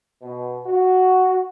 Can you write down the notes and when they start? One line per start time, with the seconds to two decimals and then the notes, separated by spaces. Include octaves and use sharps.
0.21 B2
0.66 F#4